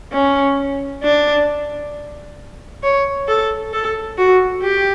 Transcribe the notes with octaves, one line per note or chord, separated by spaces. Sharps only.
C#4
D4
C#5
A4
A4
F#4
G4